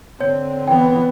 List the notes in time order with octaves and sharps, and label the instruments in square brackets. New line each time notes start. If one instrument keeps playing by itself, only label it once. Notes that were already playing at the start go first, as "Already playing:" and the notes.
[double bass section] D3 C4 [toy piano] C#5
[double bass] E3 B3 [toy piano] G5